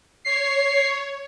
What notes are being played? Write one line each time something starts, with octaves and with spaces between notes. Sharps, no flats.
C#5 C7